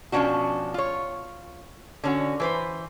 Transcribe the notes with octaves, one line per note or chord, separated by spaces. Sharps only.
B2 F3 G3 C#4 D4 F#4
F4 C#5
D3 C#4 F#4
E3 B4 C5